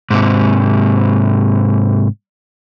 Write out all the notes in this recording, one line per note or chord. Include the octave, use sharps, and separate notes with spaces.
G#2 C3